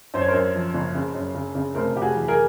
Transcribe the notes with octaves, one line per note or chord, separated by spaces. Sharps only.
F#2 C5
C#5
A#4 C5
F#2
F3
F#1
C#3
F#2
C#3
C#3
F1 A#4 C5
F1 G4
F#4 G#4
E3
G#4 A#4